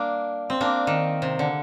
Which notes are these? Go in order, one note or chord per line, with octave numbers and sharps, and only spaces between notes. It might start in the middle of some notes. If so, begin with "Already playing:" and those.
Already playing: G3 A#3 D4
C4
A#3 D4
D#3
C3
D3